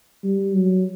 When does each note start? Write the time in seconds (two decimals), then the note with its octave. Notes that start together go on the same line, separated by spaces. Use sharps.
0.24 G3
0.54 F#3